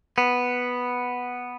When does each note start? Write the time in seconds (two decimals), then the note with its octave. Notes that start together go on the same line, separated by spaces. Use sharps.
0.18 B3